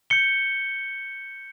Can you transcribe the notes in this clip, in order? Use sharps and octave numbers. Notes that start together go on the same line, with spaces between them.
G6 C#7 G7